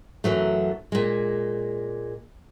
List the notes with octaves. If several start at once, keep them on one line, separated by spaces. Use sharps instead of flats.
F#2 E3 F#3 A3
A#2 G#3